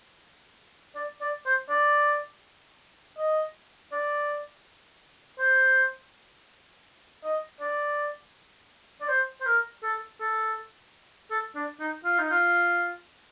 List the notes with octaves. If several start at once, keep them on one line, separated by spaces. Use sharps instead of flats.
D5
D5
C5
D5
D#5
D5
C5
D#5
D5
D5
C5
C5
A#4
A4
A4
A4
D4
D#4
F4
D#4
F4